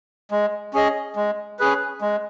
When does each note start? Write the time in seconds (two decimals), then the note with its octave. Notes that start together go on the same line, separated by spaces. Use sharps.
0.31 G#3
0.74 C#4 G#4 D#5
1.16 G#3
1.59 C#4 G#4 B4
2.01 G#3